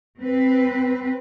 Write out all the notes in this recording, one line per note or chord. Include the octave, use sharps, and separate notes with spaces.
C4 B4